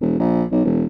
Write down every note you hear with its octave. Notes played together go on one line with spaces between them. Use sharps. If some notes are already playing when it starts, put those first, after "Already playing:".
E1
A#1
B1
E1